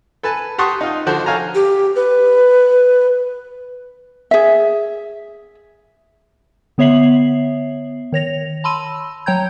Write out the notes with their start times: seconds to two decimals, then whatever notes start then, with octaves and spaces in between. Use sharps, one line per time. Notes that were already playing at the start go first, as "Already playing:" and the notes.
0.23 A4 B4 G#5 A5
0.58 G4 F#5 A5 C6 C#6 D#6
0.81 D#4 F4
1.06 D3 F3 F#4 C5
1.26 A4 C#5 F5 G#5 A#5
1.55 G4
1.96 B4
4.31 G#4 E5
6.78 D3 B3 C#5 E5 C7 F#7
8.12 D#3 C#5 A#6 F7
8.64 A5 B5 C6 E6 D#7
9.26 F#3 C#5 G5 A#5 G6 G#6